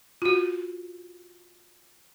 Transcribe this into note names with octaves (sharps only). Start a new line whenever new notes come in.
F4 F#4